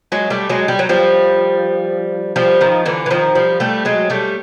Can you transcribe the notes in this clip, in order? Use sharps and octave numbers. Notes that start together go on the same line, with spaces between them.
F#3 G#3
G3 A3
F#3 G#3
G3
F#3
F3 G3
F3 G3
D#3 F3
D3 E3
E3
D#3 F3
F3 G3
G3 A3
F#3 G#3
G3 A3